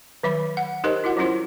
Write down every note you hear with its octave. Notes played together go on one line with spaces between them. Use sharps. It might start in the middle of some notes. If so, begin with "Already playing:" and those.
D#3 F#3 E5 B5
F#5
D#4 G4 A#4 C5 C#5 D#5
E4 F#4 A#4 F#5
F#3 G3 C#4 E4 F4 C5